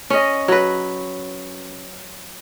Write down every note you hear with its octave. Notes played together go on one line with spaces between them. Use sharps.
C#4 D#5
F#3 B4